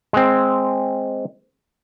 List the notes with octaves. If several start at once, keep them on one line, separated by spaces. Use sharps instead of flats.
G#3 C4